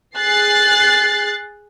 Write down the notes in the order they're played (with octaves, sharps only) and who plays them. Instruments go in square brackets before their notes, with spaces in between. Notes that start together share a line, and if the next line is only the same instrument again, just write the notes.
[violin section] G#4 F#6 A6 C7